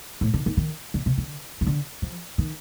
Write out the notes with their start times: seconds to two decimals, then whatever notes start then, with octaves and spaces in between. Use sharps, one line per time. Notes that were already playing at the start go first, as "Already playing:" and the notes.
0.21 A2
0.34 D3
0.46 D#3
0.57 D#3
0.94 D3
1.06 C3
1.18 D3
1.61 D#3
1.67 D3
2.02 F3
2.38 D#3